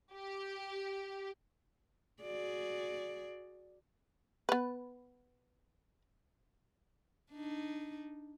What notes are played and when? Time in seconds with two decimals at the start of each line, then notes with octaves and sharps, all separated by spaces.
0.13 G4
2.22 F#4 G#4 D5
4.49 B3 B4
7.33 D4 D#4